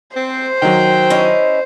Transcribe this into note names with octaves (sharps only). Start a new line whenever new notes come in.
C4 C5
D#3 F#3 G5
C#4 E4 D#5